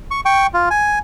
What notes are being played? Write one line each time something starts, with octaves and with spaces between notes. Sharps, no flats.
C#6
G5 C#6
F4
G#5